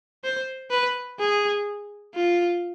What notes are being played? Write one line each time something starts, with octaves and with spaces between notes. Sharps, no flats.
C5
B4
G#4
F4